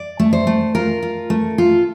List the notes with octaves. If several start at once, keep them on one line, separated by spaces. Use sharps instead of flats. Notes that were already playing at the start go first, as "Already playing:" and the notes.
Already playing: D5
A3
C5
A3
F4 A#4
F4
A3
F4 A4